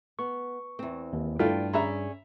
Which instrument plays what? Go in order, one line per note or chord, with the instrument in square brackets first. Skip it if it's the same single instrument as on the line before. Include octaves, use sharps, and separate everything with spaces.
[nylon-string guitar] B3 [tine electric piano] C#6
[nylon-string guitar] E2 C4
[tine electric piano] D#2
[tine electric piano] G2 [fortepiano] A3 E4 F4 [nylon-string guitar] D5 G5
[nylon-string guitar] C#4 G#4 D5 [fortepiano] E5 A#5 B5